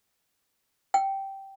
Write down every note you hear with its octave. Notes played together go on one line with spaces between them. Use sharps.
G5